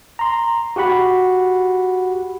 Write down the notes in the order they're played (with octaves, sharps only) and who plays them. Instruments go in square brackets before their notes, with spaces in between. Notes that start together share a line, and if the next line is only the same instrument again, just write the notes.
[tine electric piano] A#5 C6
F#4 G4 F#5 B5